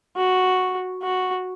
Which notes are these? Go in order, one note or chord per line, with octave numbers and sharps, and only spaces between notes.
F#4
F#4